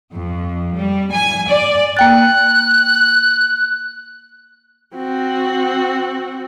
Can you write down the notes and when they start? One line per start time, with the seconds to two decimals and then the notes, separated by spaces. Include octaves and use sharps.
0.13 F2
0.75 G3
1.12 G#5
1.49 D5
1.97 A#3 G5 F#6 A6
4.96 C4 F#4